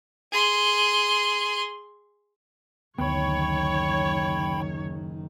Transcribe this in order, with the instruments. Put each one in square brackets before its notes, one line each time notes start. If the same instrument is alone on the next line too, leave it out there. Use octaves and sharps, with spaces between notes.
[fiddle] G#4 C6
[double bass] F#1 D#3 [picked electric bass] D2 B3 [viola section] C#5 [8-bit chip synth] G5 B5